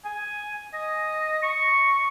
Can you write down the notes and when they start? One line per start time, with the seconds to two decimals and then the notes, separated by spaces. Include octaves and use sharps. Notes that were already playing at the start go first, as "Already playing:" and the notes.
0.05 G#5
0.73 D#5
1.43 C#6